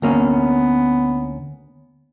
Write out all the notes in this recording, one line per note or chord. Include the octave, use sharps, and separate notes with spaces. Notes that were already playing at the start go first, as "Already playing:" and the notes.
D2 A#3 B3 C#4